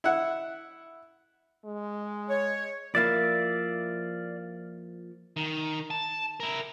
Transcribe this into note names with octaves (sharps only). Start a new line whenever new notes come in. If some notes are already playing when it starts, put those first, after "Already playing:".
E4 F#5
G#3
C#5
F3 A#3 E4 D5 E5 F5 A6
D#3
A5
E4 A#4